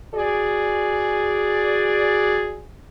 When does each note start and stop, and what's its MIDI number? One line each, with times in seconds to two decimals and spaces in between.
0.15 2.65 66
0.15 2.65 68
0.15 2.65 74